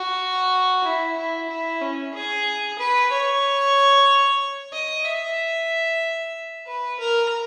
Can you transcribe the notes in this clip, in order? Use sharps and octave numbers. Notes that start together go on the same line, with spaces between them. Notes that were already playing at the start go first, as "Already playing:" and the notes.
Already playing: F#4
E4
E4
E4
C#4
G#4
B4
C#5
D#5
E5
B4
A#4